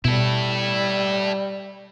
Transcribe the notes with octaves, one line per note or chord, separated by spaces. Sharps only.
B2 G3 E4 A4